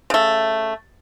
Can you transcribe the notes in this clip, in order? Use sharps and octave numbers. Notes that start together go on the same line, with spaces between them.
C#3 A3